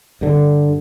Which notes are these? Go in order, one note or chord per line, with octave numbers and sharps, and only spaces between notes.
G2 D3